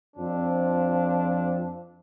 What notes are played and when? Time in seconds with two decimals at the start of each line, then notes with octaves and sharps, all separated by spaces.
0.16 F2 F3 C4 D4